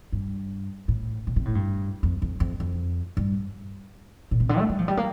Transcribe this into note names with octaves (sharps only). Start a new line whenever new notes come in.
G2
A2
A#2
C3
A2
G2
F2
F2
F2
F2
G2
A#2
C3
D3
A3
G3
F3
G3
A#3